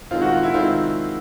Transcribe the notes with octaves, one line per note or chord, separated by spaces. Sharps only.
D#3 G#3 C4 F4
F#4
F4
E4
D#3 G#3 C4 F4